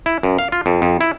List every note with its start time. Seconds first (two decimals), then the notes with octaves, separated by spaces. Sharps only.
0.06 E4
0.23 F#2
0.39 F5
0.52 F4
0.66 F2
0.82 F2
1.01 E4